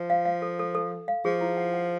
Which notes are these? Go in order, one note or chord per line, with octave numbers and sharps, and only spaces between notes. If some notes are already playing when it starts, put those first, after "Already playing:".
Already playing: F3
F5
F5
A4
A4
A4
A4
F5
F3 G#4
E4
F#5
F#5